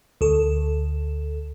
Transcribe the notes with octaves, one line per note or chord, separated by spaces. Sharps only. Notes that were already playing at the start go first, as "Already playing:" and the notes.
D2 A4